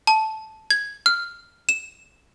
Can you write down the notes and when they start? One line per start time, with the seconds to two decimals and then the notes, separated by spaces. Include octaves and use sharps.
0.07 A5
0.70 G#6
1.06 F6
1.69 E7